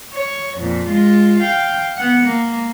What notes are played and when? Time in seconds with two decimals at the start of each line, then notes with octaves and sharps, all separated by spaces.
0.13 C#5
0.57 F2 A#2
0.87 G#3 F4
1.40 F5 G5
1.97 B3 F#5
2.26 A#3